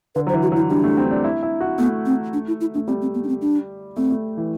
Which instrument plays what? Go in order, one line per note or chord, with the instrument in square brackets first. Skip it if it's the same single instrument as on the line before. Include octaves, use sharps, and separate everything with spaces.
[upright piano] D3 [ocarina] B4
[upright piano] F#3
[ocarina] C5
[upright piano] E3
[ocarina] F#4
[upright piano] F#3 [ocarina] E4
[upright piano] G3 [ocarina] D4
[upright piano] A3
C4
D4
E4
E4
F#4
[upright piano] A3 [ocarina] B3
[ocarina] C4
D4
E4
E4
[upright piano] A3 [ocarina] D4
[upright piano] G3 [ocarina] C4
[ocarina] C4
B3
D4
C4
D4
[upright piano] A3 [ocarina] C4
[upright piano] A3
E3